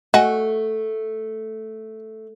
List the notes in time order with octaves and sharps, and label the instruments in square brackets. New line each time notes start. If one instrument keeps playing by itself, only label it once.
[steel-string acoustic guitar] A3 [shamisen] F#4 [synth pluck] D#5 G#5